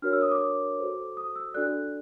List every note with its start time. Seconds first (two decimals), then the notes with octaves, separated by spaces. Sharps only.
0.02 D4 F#4 A#4 C#5 F6
0.13 E6
0.22 D#6
0.32 D6
0.79 F#4 A4 C5
1.17 D#6
1.36 E6
1.54 D4 F#4 A4 D5 F#6